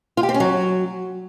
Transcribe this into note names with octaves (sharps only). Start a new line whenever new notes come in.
F4
G4
C4
C#4
F#3